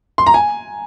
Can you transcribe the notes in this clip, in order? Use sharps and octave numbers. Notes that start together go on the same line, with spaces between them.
C6
A#5
G#5